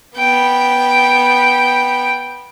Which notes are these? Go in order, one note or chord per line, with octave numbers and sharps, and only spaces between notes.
B3 G5